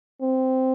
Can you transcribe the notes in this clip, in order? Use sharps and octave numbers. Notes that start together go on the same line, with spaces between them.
C4